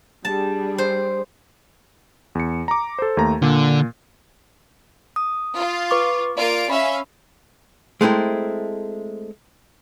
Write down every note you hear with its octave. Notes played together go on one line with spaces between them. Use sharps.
G3 D4 G#4 A5
C5
E2 C#7
A#5 D6
A4 C5
D#2 A3 A#5
A#2 D3
D#6
F4
B4 C#6 D6
A#3 F4 D5 D7
C#4 E5 F5 B5
G#3 A3 C4 E4 A#4